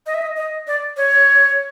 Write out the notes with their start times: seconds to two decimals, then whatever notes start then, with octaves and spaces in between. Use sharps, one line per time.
0.06 D#5
0.14 E5
0.22 D#5
0.37 D#5
0.67 D5
0.97 C#5